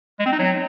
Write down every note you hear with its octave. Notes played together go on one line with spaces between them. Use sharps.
G#3
C4
D#4
F#3